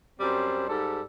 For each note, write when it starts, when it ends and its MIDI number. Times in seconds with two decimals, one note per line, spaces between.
0.20 0.66 42
0.20 0.66 55
0.20 0.66 60
0.20 0.66 72
0.69 1.02 44
0.69 1.02 55
0.69 1.02 69